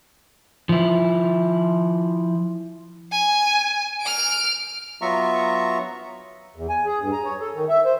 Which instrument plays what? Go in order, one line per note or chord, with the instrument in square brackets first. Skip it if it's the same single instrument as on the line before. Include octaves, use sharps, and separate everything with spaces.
[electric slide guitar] F3 E4
[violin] G#5
F6 D7
[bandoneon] F#3 B3 F4 E5 A#5 C#6
[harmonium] E2
G#5
G#4
G2
A#5
C#5
A4
D#3
E5
C5